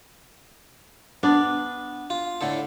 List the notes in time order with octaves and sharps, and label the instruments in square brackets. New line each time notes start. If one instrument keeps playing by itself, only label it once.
[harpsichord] B3 [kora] D4
[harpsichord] F4
A2 D3 A4